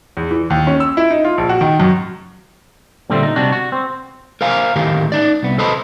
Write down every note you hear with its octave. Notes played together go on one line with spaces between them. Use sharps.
E2
E3
D#2
C#4
E6
E4
D#4
F4
A#1
F#4
D#3
F#2
A#2 D3 G3 A3 C4
D#4
C3 G3 D4 F#4
F#4
C4
A#4 C5 F5 G#5 A#5
A2 D#3 G4 A#4 F5
D#4 D5
C2 B3
A4 B4 C5 D#5 A5 B5